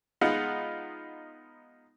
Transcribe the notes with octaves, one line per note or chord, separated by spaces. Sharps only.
G#3 B3 D#4 F4 F#5